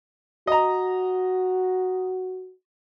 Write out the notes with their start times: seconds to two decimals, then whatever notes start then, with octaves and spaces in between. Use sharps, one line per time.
0.47 F#4 D#5 A#5